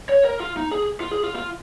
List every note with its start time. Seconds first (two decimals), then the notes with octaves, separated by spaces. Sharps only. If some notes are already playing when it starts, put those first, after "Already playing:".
0.09 C#5
0.25 A#4
0.40 F4
0.57 D#4
0.72 G#4
1.00 F4
1.11 G#4
1.24 F4
1.36 F4